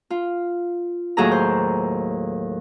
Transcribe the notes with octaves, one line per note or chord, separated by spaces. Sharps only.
F4
D#2 A2 F#3 G#4 A4 A#5
C5